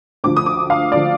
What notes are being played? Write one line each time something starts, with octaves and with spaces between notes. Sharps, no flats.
D2 D3 F3 D6
D#6
D6
F5
D3 F3 D5